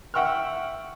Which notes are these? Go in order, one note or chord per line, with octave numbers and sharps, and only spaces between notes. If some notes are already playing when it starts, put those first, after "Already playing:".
E5 F#5 G5 C#6 E6 F6